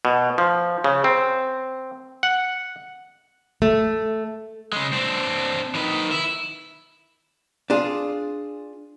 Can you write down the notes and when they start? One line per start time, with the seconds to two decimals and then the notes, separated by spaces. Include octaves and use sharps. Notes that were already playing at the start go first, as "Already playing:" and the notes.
0.05 B2
0.38 F3
0.84 C#3
1.04 C4
2.23 F#5
3.62 A3
4.72 C#3 G#3
4.93 C4 D4
5.75 D#3 B4
6.11 E4
7.70 D4 F4 G#4